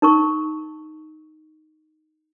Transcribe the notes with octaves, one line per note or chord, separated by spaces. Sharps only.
D#4 A#4 C#6